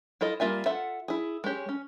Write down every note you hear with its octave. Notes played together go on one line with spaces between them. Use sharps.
E4 F4 A4 D#5
G3 A#3 F4 E5 G#5
F4 A4 E5 F#5
E4 G#4
G#3 C#4 G4 C#5
C#4